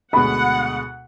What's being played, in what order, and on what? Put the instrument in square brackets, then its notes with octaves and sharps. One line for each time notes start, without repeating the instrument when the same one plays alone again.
[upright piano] D2 B2 G#3 [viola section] F#5 [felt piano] B5